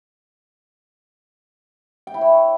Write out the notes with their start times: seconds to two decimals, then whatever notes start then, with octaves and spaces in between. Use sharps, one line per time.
2.07 G5
2.14 E4
2.21 C#5